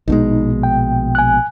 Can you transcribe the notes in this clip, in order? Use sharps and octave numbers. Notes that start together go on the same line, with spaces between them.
A#1 B2 G#3 D#4
G5
G#5 F#6